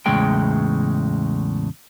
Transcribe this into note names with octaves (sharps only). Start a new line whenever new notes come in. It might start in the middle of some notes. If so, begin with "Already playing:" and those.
E2 A2 C#3 G#3 G5